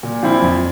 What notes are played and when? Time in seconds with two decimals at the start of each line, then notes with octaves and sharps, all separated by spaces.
0.03 A#2
0.23 F3 C4 E4
0.42 F2